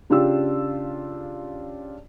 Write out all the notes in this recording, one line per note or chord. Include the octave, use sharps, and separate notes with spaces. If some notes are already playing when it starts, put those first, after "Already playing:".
C#3 D4 F4 G4 E6